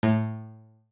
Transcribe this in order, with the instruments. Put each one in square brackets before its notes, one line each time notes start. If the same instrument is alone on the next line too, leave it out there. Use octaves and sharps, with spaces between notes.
[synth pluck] A2